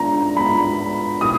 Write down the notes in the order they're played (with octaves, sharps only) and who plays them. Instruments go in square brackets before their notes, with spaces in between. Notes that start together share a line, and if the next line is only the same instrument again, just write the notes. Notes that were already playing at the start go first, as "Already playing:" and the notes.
Already playing: [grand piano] G#3 B3 D4 F4 [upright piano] A#5
[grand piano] G#3 B3 D4 F4 [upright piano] B5
[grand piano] B2 G#3 B3 E4 A4 [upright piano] D#6